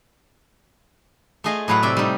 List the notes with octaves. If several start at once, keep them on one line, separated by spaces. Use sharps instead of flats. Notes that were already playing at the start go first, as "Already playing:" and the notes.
A3 F4 G#4 D#5 F5
A2 F#3 B4 F5 F#5
C3 D5 E5
G3 D#4